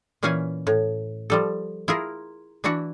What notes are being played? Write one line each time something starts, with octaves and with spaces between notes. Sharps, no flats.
A#2 E3 C#4 F5 F#5 G#5
A2
F3 G3 A4
E4 F4 G#4 A#4
E3 D4 E4 F#4 F#5